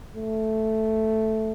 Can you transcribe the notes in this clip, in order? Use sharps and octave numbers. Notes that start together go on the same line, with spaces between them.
A3